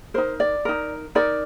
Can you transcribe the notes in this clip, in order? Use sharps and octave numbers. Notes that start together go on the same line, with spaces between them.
D#4 A#4 C5
D5
D#4 A#4
D#4 A#4 D5